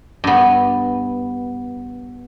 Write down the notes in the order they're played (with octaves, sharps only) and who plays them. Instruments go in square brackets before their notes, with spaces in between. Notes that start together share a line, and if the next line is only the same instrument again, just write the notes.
[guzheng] G2 B3